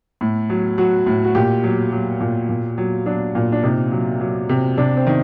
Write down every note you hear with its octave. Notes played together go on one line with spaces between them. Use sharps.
A2
F#3
F#3 F#4
A2
F#4
A#2 G4
F#3
F#3
A#2
A#2
F#3
F#3 D4
A#2
D4
C3 D#4
F#3
F#3
C3
C3 D4
C4
D#3